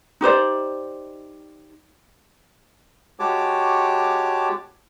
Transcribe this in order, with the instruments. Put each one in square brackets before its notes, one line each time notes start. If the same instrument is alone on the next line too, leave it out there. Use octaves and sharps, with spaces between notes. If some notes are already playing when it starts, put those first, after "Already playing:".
[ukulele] D#4 G4 C5 D5
[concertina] G#3 F#4 G4 C#5 A5 D6